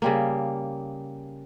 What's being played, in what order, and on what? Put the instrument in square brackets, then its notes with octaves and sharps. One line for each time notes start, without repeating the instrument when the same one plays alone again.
[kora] C#3 G3 A#3